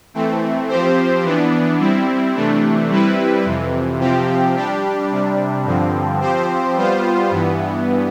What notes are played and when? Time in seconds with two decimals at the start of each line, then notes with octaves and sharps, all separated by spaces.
0.14 E3 A3 C4
0.68 F3 C4 G4 C5
1.24 E3 B3 D4
1.79 G3 C4 E4
2.34 C3 E3 A3 D4
2.89 G3 C4 E4 B4
3.45 F2 C3 E3
3.99 C3 F3 C4 G4
4.55 G3 D4 G4
5.11 C3 G3 D4
5.65 G2 D3 F3 C4
6.21 F3 C4 G4 C5
6.76 G3 B3 F4 C5
7.31 G2 E3 B3